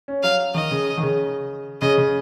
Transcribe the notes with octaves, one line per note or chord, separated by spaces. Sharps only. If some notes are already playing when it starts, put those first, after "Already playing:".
C#4
F#3 F5
D#3 D#5
C#3
D#3
C#3
C#3 D#5
C#3